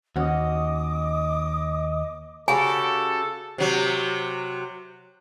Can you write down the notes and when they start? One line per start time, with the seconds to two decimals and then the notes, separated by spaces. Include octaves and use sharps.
0.16 D#2 C#4 F#4 D#5 D6 D#6
2.48 C#3 F#4 G4 A4 G#5
3.58 C3 F#3